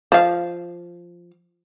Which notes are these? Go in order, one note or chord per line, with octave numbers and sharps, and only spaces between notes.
F3 F5